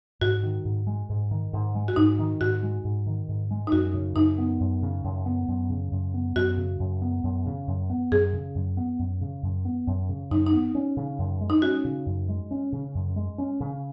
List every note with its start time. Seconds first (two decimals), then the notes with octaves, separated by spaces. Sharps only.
0.21 G#2 F#4
0.43 D#3
0.65 G#2
0.87 G#3
1.09 G#2
1.31 D#3
1.53 G#2
1.75 G#3
1.88 F#4
1.96 G#2 D#4
2.19 D#3
2.41 G#2 F#4
2.63 G#3
2.84 G#2
3.06 D#3
3.28 G#2
3.51 G#3
3.67 D#4
3.72 F#2 F#4
3.94 C#3
4.16 F#2 D#4
4.38 B3
4.60 F#2
4.82 C#3
5.04 F#2
5.26 B3
5.48 F#2
5.70 C#3
5.92 F#2
6.14 B3
6.36 F#2 F#4
6.57 C#3
6.80 F#2
7.02 B3
7.24 F#2
7.46 C#3
7.67 F#2
7.90 B3
8.11 F#2 G#4
8.33 C#3
8.55 F#2
8.77 B3
8.99 F#2
9.21 C#3
9.43 F#2
9.65 B3
9.87 F#2
10.09 C#3
10.31 F#2 D#4
10.47 D#4
10.53 B3
10.75 C#4
10.97 C#3
11.19 F#2
11.41 G#3
11.50 D#4
11.62 C#4 F#4
11.85 C#3
12.06 F#2
12.28 G#3
12.51 C#4
12.72 C#3
12.95 F#2
13.16 G#3
13.38 C#4
13.60 C#3